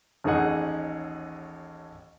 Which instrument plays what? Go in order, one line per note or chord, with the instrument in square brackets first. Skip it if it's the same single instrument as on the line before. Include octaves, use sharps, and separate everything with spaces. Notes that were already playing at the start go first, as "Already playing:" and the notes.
[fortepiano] A1 D#2 D#4 G#4 F#5